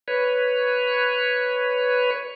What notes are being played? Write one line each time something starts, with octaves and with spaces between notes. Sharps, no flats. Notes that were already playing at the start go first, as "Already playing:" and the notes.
B4 C#5